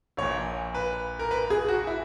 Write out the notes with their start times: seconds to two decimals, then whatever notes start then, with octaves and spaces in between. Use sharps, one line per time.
0.17 A#1 A#2 C#5
0.74 B4
1.19 A#4
1.31 B4
1.50 G#4
1.68 F#4
1.87 E4